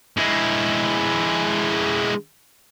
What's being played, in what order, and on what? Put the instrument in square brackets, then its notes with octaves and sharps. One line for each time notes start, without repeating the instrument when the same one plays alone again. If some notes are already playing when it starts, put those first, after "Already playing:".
[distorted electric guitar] G#3 E4